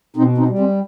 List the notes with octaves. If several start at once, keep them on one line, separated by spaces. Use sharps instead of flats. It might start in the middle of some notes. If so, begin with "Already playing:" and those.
B2 C4 D#4
C4 D#4
G3
G#3 C4